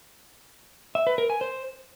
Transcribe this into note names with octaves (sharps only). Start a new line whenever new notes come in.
E5
B4
A#4
G#5
C5